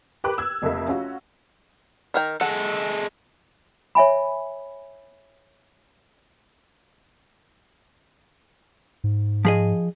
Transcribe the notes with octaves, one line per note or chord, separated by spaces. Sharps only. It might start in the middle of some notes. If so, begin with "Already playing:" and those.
G4 A#4 B4 G5 D6 F#6
E6 G#6
F1 F2 A#3 A4 D#5 E5
C#4 F4 F#4
D#3 A#4 G5
G#3 A4 F#5
C#5 E5 G#5 B5
G#2
F3 G#4 D#5